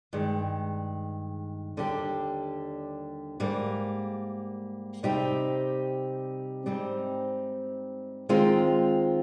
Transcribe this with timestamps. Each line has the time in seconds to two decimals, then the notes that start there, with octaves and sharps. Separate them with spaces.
0.13 G2 D#3 G#3
1.77 D#2 D3 G3 D4 G4
3.40 G#2 G3 A#3
5.03 C3 G3 C4 D#4 G4
6.66 G#2 G3 C4 D#4
8.29 D#3 G#3 C4 F4